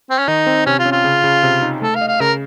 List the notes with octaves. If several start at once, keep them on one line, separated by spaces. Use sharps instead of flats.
C4
C#4
D#3 D#4
C4
C3 C#4
F4
C#4
F4
C#3
C#3
C3
D#4
A3 A4
F5
D#5
F5
C#3 A#4